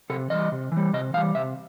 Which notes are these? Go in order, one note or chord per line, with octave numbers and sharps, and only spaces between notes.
C3 A4
E3 G3 D#5
C3
E3
G3
C3 D#5
E3 G3 F5
C3 E5